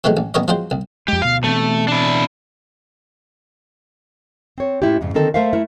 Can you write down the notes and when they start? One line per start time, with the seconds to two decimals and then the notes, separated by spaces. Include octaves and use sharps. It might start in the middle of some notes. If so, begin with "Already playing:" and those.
0.04 C3 D#3 E3 F#3 G#3 A3
0.17 A1
0.34 A1 B3 A#4 C#5 D#5
0.48 F3 F#3 G#3 C4 C5
0.71 C2
1.08 F2 G#3 G4
1.22 D2 B2 F5
1.44 B2 E3 A3 C4
1.88 D4 E4
4.58 C4 C#5
4.82 A2 A3 C#4 E4 F4 G4
5.01 F2 G#2 C#3
5.14 D3 D#3 C4 D#4 A4 A#4
5.34 A3 A#4 C5 E5 F5
5.53 A3 E4 A#4